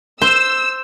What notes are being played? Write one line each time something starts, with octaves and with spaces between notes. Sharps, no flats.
C5 E6